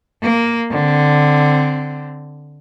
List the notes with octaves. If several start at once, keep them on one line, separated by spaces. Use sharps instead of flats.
A#3
D3 C4